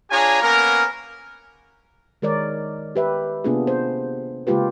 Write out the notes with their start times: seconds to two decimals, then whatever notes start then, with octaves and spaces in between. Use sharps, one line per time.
0.11 D4 F4 G#4 C#5 G#5 A#5
0.43 A#3 B3 C#4 A#4
2.22 D#3 G#3 A#4 C#5 D5
2.96 G4 B4 E5
3.44 C3 A#3 B3 D4 F4 G#4
3.67 C5
4.47 C#3 G#3 A#3 F4 G4 B4